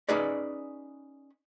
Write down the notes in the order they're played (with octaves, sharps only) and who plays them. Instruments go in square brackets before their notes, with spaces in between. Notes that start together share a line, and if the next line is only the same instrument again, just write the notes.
[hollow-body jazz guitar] C#4 D#4 G#4 B4 D5